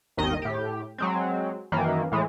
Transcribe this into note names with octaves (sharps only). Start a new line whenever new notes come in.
G#1 D#2 D#3 D#5
A2 G4
F#3 G#3 C4
F#2 D#3 E3 A#3
A2 E3 G#3